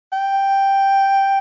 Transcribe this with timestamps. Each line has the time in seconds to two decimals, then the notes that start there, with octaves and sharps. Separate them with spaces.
0.13 G5